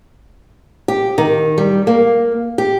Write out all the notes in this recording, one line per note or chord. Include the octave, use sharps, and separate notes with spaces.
G4
D#3
G3
A#3
G4